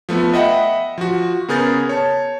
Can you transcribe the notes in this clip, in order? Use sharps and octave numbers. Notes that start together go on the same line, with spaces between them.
F3 A3 B3
D#5 E5 F#5 G5 B5
F3 F#4
C#3 B3 G#4 A#4 G6 A6
C#5 A5